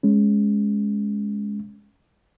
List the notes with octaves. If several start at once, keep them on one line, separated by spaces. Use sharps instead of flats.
G#3 C#4